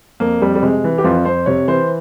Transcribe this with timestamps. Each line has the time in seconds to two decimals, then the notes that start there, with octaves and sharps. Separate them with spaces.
0.20 F2 A#3
0.42 F2 G3
0.55 G3
0.63 C3 G#3
0.84 E3
0.98 G4
1.04 F2 F4
1.25 F2 C5
1.46 C3 C#5
1.68 E3 C5